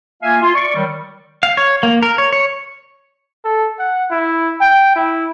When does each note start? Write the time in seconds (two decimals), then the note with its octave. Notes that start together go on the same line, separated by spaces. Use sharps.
0.22 A#3 F4 E5 F5 G#5
0.42 F4 C6
0.54 D5 C#6
0.74 D#3 F#3 G3
1.43 F5
1.57 C#5
1.83 A#3
2.03 A#4
2.18 C#5
2.33 C#5
3.44 A4
3.79 F#5
4.11 E4
4.61 G5
4.96 E4